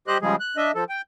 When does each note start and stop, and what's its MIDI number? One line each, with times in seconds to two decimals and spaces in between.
0.08 0.18 55
0.08 0.18 67
0.08 0.18 72
0.08 0.18 75
0.08 0.18 90
0.22 0.36 49
0.22 0.36 53
0.22 0.36 55
0.22 0.36 56
0.22 0.36 68
0.40 0.57 90
0.57 0.72 62
0.57 0.72 75
0.57 0.72 76
0.75 0.84 53
0.75 0.84 69
0.89 1.02 79